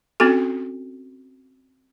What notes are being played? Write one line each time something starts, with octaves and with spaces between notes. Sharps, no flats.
C4 C#4 F#4 A4